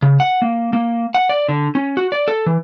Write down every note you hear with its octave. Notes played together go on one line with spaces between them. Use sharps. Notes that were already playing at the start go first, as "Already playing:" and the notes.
C#3
F#5
A#3
A#3
F#5
D5
D3
C#4
F#4
D5
A4
E3